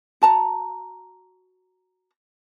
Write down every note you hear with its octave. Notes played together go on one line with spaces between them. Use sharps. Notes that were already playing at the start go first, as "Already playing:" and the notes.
F#4 A5 A#5